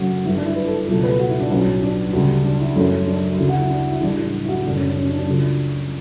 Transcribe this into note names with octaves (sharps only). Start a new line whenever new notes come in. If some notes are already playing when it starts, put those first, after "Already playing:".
Already playing: F#1 F#2 D3 A3 C#4 F#4
G1 G2 D3 A3 E4
D4
E4
B4
A4
C#2 B2 F#3 A3 A4
B4
F#4
E4
D4
B1 A2 F#3 C#4
D4
D2 C#3 G3
D4
E4
F#2 E3 A3 C#4
D4
D2 C#3 F#3 E4
F#4
E4
D4
E4
A1 A2 G3 D4
D4
E4
F#4
F#1 F#2 D3 A3 D4
C#4
D4
C#4
D4
D4
C#2 C#3 F#3 A3 D4